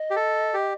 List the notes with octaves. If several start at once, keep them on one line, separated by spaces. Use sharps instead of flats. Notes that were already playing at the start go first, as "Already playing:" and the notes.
Already playing: D#5
G4
A4
G4